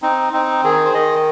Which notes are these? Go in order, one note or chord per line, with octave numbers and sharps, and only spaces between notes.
C4 D#4
C4 D#4
D#3 G#4
C5
D#3 D#5